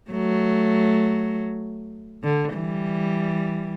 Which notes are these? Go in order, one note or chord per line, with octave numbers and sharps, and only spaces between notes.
F#3 A3
D3
E3 G3